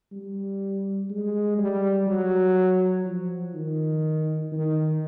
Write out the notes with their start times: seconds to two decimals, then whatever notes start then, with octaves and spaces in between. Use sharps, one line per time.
0.12 G3
1.10 G#3
1.58 G3
2.07 F#3
3.05 F3
3.55 D#3
4.52 D#3